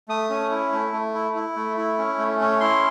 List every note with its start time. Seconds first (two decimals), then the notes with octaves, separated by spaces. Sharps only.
0.08 A3 D#6
0.30 C#4
0.51 E4
0.73 A3
0.93 A3
1.15 E4
1.36 E4
1.56 A3
1.77 E4
1.98 C#4
2.18 A3
2.40 C#4
2.60 E4 C6